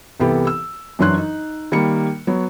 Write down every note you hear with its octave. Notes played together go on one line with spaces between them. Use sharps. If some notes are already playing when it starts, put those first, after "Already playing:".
C2 E3 B3 G4 A4
E6
F#2 E3 F#3 D4 C6 F#6
D#4
D#3 G3 A#3 B5 C#7
F#3 B3 C#5